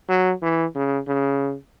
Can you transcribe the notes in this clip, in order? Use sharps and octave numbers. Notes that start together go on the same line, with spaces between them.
F#3
E3
C#3
C#3